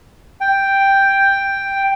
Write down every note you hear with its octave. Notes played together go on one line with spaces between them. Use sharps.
G5